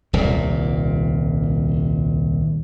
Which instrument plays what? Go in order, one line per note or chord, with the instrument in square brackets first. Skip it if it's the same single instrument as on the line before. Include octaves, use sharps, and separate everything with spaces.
[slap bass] D#1 C2 A#2